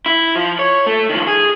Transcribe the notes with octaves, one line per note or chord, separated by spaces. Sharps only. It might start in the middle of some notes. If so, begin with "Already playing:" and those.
E4
F3
C#5
A3
D#3 F3
G#4